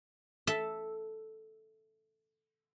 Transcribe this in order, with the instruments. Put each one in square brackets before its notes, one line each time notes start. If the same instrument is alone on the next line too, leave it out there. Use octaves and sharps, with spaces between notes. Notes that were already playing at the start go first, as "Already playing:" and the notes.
[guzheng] A4 E5